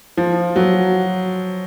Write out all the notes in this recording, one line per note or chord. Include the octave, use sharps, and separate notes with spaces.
F3
F#3